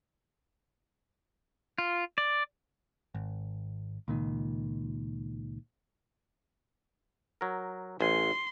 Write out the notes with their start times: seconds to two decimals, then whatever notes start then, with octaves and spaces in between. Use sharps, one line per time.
1.78 F4
2.18 D5
3.15 G#1
4.08 C#2 A#2 D#3
7.41 F#3 A#4
8.01 A1 G#5 C6